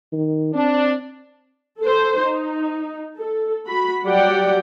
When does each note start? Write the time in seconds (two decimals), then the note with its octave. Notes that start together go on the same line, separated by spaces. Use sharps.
0.12 D#3
0.54 C4 D4
1.80 A4 C5
2.21 D#4
3.19 A4
3.66 F#4 B5
4.04 F#3 G3 G4 D5 F#5 G5